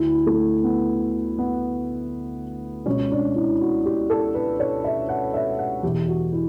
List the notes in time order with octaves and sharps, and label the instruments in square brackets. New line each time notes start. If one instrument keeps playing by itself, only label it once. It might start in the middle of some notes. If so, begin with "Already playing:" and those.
Already playing: [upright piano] D2 D3 E4
A3
B3
B3
C#2 B2 C#4
D4
E4
F#4
G4
A4
B4
C#5
E5
F#5
E5
F#5
E2 B2 G4
F#4
E4